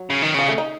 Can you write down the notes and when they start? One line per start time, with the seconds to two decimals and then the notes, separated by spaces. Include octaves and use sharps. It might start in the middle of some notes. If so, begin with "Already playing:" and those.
Already playing: F#3
0.10 C#3
0.22 D#3
0.34 C#3 F3
0.48 A3
0.58 D#4